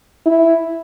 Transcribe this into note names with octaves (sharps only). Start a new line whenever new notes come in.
E4